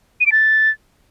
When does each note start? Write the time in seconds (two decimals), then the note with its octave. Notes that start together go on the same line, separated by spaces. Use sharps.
0.21 D#7
0.26 D7
0.32 A6